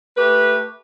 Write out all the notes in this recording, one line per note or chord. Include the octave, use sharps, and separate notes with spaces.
A3 G4 B4